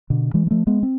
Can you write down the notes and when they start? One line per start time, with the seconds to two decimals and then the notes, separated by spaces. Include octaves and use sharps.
0.10 B2 D3
0.34 E3 G#3
0.47 G#3
0.51 F3 A3
0.67 G#3 B3
0.83 C4